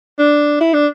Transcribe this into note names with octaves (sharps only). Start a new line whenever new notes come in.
D4
E4
D4